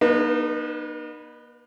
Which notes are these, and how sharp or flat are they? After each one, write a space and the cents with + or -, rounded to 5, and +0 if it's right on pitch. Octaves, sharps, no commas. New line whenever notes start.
A#3 +45 D#4 -35 B4 +0